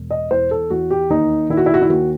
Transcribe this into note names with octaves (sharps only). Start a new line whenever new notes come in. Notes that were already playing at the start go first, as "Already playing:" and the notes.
Already playing: E1
D#5
E2 C5
A4
E2 F#4
G4
D#2 D#4
D#3 E4
F#4
E4
F#4
E4
D#2 F#4